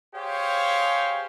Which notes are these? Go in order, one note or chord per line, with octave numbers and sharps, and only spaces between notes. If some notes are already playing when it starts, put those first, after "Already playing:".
G4 G#4 C5 C#5 F5